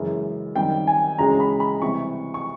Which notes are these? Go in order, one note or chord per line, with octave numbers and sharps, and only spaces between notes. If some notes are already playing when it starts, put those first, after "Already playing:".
Already playing: F#2 C#3 E3 G#3
F#2 D#3 G3 C4 G5
G#5
D2 C#3 E3 G#3 C#4 A#5
B5
B5
C3 E3 G3 C4 C#6
C#6